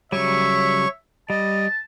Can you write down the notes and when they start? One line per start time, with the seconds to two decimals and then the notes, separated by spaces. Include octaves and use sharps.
0.12 C#3 F#3 G3 C#5 E5 C#6
1.30 G3 D#5 A5